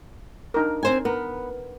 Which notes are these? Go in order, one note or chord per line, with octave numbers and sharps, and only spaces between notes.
D4 D#4 A#4
C4 C5 G#5
B3 A#4